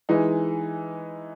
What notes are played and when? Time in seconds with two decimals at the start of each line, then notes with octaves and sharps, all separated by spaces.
0.09 E3 G#3 D#4